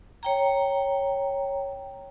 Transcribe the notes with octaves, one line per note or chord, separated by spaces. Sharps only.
C#5 G5 A#5